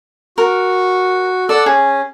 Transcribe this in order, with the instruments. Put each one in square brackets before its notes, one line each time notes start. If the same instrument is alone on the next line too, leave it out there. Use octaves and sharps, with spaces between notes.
[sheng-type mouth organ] F#4 [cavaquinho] A#4
[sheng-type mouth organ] A4 F#5 E6 [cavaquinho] D5
[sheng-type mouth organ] C#4 [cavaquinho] G#4